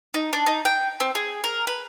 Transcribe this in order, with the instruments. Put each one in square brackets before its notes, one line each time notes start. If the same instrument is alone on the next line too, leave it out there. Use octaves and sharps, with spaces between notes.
[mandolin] D#4
D4
D#4
G5
C4
G#4
A#4
B4